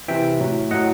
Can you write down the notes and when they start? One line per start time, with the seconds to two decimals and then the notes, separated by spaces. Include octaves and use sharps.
0.08 C3 E3 E5 G5
0.40 A2 F#3
0.71 A2 F#3 D#5 F#5